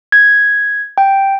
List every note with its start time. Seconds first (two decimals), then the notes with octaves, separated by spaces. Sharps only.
0.12 G#6
0.98 G5